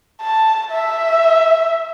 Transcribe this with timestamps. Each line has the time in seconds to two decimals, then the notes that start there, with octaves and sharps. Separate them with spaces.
0.22 A5
0.71 E5